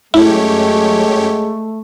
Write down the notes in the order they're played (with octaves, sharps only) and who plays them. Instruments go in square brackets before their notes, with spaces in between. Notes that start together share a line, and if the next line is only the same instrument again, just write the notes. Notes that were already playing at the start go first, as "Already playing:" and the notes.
[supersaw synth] F#2 G4 C#5 [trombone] G#3 [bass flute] A3 [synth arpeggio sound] E4